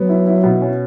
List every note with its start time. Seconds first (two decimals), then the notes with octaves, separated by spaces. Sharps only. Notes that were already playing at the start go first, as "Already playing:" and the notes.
Already playing: F#3 B3
0.09 E4
0.27 E4
0.44 B2
0.61 C#4